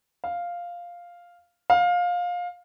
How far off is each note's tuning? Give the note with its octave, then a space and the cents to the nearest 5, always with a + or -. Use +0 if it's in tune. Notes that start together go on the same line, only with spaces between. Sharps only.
F5 +0
F5 +20